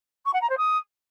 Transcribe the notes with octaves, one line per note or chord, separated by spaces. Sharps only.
C#6
F#5
A#5
C5
D#6